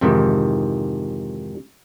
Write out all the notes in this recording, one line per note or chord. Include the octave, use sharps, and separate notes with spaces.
F2 G#2 C3 D#3 E3